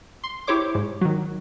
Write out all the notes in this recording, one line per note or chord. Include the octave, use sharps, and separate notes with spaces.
C6
E4 G4 C5 C#5 D6
G#2
D#3 F#3